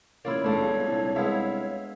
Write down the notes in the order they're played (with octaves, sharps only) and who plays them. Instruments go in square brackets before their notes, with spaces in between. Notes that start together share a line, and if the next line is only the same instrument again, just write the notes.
[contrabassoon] A1 [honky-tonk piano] A#3 [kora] E4 F4 D5 [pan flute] C#5
[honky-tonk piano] C#2 A#2 [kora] A3 D4
[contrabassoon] G1
[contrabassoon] C2 [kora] A4
[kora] G#3 B3 [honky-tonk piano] E5 F5